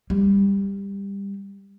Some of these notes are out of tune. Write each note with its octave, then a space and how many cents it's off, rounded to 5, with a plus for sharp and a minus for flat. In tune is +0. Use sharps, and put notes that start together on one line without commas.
G3 +20